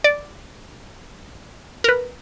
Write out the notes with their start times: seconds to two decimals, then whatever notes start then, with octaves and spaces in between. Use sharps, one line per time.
0.04 D5
1.84 A#4 B4